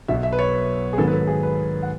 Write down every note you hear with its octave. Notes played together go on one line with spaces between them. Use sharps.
B1 B2 F#3 E5
E5
B4
C#5
G#4
G#2 D#3 F#3 B3 A4
B4
A4
G#4
B4
F#5